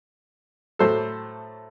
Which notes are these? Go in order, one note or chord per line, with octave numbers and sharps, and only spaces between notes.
A2 F#3 A3 A4 C5